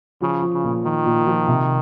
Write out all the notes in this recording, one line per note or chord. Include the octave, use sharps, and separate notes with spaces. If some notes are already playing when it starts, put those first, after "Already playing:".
C#3 F3
F3
C#3
A#2
D#3 F3
A#2
F3
C3